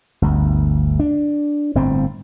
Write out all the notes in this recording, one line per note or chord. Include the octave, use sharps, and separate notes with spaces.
G1 D2
D4
G1 A2 C4